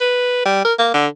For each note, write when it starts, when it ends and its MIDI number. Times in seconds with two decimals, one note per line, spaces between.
0.01 0.43 71
0.45 0.61 55
0.65 0.74 70
0.79 0.92 58
0.94 1.07 50